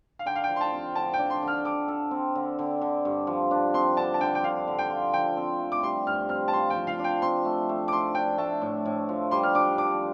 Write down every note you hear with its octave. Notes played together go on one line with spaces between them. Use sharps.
F5
D3 G5
F5
F3 G5
C6
A5
C4
D3 A5
G5
D4
C6
D3
F6
A4 D6
A4
C4
D3
D3
D3
G2
F3
D4
C4 C6
D3 A5
A5
D3 G5
G5
D3 F5
D3
G5
F4
F3 G5
C4
A3
D6
G3 C6
G2 F6
C4 F6
A5
F3 C6
G5
F3
F5
D4 G5
C4 C6
A3
A3
D6
D4 C6
D4 G5
A3 A5
A2
A2
F3
G3 C6
F6
D4 D6
D4 D6